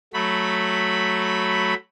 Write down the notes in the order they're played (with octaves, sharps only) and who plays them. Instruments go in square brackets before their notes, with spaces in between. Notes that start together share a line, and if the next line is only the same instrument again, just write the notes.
[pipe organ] F#3 A3 B5